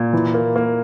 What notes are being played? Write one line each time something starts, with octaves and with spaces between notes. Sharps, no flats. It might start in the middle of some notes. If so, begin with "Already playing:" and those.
Already playing: A#2
E3
A#3
A#3